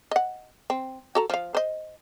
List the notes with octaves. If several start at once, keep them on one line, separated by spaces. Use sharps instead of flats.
D#5 F#5
C4
F#4 A4 A#5
F3 F5
C5 D#5